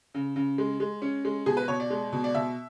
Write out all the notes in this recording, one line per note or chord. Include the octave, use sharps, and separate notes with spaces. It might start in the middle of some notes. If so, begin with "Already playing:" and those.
C#3
C#3
G#3
G#3
C#4
G#3
B2 G#4
B4
B2 C#5
D5
G#3
B2
D5
B2 E5